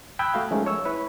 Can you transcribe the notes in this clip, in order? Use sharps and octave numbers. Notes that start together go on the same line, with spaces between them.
G5 B5 D#6 E6 F#6 G#6
A3 F#4 F5
F3 G#3 A3 C#4 D#4 A#4
C#5 E6
E4 B4 C#5